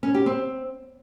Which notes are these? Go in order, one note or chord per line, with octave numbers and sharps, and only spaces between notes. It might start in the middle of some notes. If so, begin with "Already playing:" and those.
C#4
G4
C4